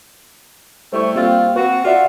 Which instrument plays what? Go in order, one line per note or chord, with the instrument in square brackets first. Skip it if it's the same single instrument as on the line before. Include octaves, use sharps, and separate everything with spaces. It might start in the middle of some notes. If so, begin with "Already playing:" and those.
[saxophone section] G3 A3 E4 [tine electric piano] C5 C#6
[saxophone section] G3 C4 F4 [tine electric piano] A#3
[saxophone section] C4 F#4 [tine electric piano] B4
[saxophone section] F4 E5 [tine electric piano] F#4 D5 F#5